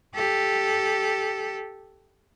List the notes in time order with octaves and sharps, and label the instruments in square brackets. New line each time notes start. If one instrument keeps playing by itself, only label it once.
[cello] G4 A4